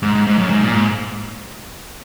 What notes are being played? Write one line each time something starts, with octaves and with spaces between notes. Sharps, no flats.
G#2
G#2
G#2
F#2
G#2
A#2
G#2